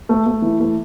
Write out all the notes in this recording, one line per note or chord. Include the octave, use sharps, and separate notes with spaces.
A3
A3
E3
A3